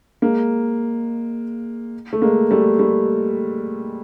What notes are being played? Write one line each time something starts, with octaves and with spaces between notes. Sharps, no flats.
G#3 A#3
A3
G#3 A#3
G3 A3
G3 A3